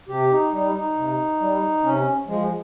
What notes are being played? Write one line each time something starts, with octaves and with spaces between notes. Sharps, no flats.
C3 G4
D#4
G3 D#4
D#4
C3
G3
C3 C#4
F3 G#3